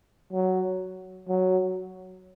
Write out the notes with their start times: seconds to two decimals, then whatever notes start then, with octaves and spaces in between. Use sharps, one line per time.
0.33 F#3
1.29 F#3